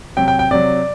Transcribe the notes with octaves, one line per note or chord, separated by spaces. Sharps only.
C3 F#3 G5
G5
G5
C3 F#3 D5